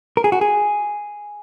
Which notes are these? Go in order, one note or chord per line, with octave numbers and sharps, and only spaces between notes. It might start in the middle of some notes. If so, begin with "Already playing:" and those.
A#4
G#4
F#4
G#4